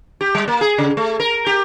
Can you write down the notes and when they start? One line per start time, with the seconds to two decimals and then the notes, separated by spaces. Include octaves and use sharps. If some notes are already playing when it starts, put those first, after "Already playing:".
0.21 G4
0.35 G3
0.48 A#3
0.61 G#4
0.78 C#3
0.97 A3
1.20 A#4
1.46 G4